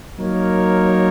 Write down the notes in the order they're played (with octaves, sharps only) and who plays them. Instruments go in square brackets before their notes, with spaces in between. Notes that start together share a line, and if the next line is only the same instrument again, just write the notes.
[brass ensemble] F#3 A#3 D#4 A#4 C#5